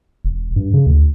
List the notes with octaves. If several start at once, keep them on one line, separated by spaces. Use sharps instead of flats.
E1
G2
C#3
D2